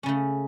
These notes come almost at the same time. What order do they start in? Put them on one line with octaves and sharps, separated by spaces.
C#4 C#3 A3